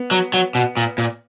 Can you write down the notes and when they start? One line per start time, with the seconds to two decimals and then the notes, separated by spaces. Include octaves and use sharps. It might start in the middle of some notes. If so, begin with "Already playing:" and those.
Already playing: B3
0.11 F#3
0.34 F#3
0.55 B2
0.77 A#2
0.98 A#2